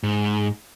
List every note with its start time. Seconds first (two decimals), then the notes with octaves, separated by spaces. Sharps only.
0.03 G#2